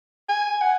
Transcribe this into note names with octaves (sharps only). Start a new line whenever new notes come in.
G#5
F#5